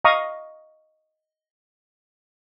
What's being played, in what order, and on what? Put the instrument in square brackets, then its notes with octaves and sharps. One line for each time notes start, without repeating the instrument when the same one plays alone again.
[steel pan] D#5 F5 A#5 C#6 D#6